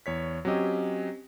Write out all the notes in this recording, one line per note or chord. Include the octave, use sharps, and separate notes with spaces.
E2 C#5 B6
F#3 C4 C#4 G4 D#5